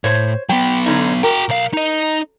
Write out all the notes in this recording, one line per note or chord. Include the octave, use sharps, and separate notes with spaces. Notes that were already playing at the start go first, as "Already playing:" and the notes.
A2 C5 C#5
F#3 B3 G5
D3 C#4 D#4
F#4 A#4 G5
B1 F5
D#4 D#5